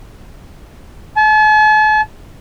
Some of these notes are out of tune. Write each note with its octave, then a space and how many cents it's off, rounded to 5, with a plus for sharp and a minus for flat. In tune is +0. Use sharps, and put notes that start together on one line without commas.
A5 -45